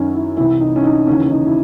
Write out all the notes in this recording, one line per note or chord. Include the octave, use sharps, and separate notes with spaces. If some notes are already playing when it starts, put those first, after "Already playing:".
Already playing: F#2 D#3 C#4 D#4
E4
C2 C3 E3 E4
D#4
C#4
D#4
D#2 C#3 E3 C#4
D#4
E4